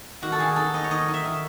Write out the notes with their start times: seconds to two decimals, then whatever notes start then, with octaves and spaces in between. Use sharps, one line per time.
0.22 D#3 F#4
0.32 A4
0.39 D#3 G#4
0.56 D#4 A4
0.74 D#4 D#5
0.84 C#5
0.91 D#3 D#5
1.08 D#4
1.14 E5
1.25 D#3